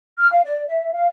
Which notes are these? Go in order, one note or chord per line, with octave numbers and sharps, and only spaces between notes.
F6
F5
D5
E5
F5